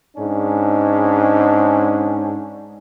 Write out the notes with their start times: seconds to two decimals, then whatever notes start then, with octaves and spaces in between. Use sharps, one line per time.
0.17 G#2 C#4 D4